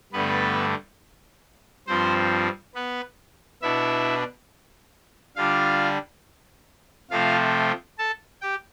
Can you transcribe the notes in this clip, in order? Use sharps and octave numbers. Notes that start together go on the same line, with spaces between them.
G2 D3 A3 B3 B4
G2 F3 C4 C5
B3 B4
B2 B3 D4 E4 E5
D3 G3 D4 F4 F5
C3 F3 A3 C4 F4 F5
A4 A5
G4 G5